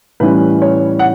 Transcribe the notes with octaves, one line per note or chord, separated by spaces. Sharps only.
A2 E3 G3 C#4 E4 B4
C#5
F#5